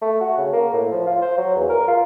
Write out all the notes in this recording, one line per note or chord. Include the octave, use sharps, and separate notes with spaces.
A3
F#4
C#3
A#3
A2
F3
F4
C5
F#3
E2
A#4
F4